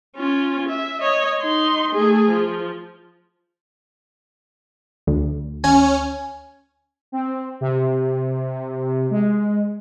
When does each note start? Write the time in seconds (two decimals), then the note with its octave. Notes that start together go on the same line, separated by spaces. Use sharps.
0.16 C#4 F4
0.69 E5
1.01 C#5 D#5
1.41 D#4 C6
1.92 A3 G#4
2.30 F3
5.07 D2
5.64 C#4 G#5
7.12 C4
7.61 C3
9.11 G#3